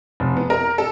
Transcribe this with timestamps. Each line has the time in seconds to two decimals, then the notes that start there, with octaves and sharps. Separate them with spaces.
0.20 F1
0.37 B3
0.50 A#4
0.78 A4